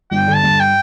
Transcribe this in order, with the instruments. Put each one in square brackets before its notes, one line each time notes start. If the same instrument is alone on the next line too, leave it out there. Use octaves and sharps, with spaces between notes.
[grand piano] G1 [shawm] G5
[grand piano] D3
[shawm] A5
[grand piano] G2
[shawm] G5